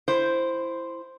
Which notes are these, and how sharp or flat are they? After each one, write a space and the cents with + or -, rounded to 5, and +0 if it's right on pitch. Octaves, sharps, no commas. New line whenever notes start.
E4 +15 C5 +0